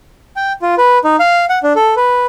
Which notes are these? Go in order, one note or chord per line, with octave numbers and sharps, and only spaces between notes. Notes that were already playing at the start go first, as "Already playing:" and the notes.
G5
F4
B4
D#4
F5
F#5
D4
A4
B4